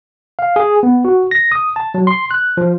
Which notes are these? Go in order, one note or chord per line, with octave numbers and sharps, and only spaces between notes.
F5
G#4
B3
F#4
A#6
D#6
A5
F#3
C6
F#6
F3